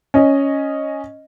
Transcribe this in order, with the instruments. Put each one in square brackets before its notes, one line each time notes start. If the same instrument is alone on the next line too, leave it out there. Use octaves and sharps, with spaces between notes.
[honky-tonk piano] C#4 D#5